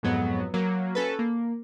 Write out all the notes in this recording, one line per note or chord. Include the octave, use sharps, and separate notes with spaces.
F2 G#2 F#3 B3
F#3 A#3
C#4 A4 B4
A#3